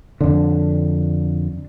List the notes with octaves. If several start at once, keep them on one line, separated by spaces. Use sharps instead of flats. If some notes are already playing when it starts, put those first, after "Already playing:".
F2 D3 D4